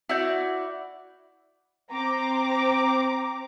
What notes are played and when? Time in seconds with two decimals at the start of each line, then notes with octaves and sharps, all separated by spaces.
0.09 E4 F#4 D5 G6
1.90 C4 A#5 D6